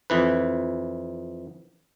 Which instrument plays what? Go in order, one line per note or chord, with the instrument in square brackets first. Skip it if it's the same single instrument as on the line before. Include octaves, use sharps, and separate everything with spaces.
[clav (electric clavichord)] F2 E3 B4